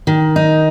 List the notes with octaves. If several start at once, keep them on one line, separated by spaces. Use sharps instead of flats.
D#3
D#4